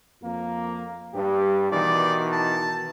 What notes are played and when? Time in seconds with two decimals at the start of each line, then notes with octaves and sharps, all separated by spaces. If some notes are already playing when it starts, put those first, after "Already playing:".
0.22 F2 A#3
1.13 G2 G4
1.72 B2 D#3 E3 D5
2.32 A5